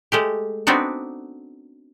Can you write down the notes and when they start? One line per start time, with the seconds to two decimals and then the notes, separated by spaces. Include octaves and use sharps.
0.12 G#3 A3 G4
0.67 B3 C4 D4 D#4 F#4